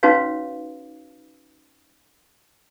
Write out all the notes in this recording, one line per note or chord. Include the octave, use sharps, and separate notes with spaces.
C#4 D#4 F#4 B4 C#5 F5